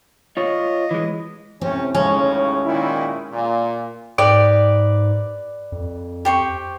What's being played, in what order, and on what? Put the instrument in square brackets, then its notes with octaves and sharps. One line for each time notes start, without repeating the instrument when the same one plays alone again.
[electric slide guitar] F4 C#5 [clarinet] D#5
[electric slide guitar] E3 G#3
[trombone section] A2 C3 C#4 [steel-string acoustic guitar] C4
[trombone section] D#2 A2 C#3 [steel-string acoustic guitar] G#3 [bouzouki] C#4
[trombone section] A#2 D#3 E4
A#2
[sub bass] G#2 [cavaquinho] G4 B4 D#5 [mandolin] D5
[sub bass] F2
[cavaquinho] G4 C5 C#6